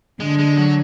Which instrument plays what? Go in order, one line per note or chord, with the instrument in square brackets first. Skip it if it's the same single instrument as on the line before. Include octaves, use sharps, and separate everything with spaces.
[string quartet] D3 [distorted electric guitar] G#3
[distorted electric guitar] G#3
F#3